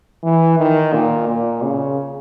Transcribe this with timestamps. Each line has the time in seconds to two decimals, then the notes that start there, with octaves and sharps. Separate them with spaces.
0.24 E3
0.59 D#3
0.93 A#2
1.28 A#2
1.63 C#3